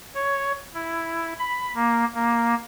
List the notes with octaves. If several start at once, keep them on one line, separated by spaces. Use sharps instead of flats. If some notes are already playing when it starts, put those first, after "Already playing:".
C#5
E4
B5
A#3
A#3